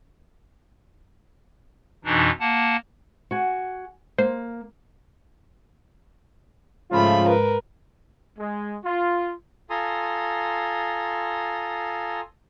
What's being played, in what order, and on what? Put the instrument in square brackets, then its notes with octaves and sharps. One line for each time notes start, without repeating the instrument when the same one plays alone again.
[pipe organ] F2 B2 E3 D4 D#4
A#3 F#5 A5
[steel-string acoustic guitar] F#4 G#5
[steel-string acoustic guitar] A#3 [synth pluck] C5
[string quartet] G#2 A3 B5 [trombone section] C#3 F3 F4
[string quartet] A#4 B4
[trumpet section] G#3
F4
[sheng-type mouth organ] F4 A4 G#5 A#5 C6 D#6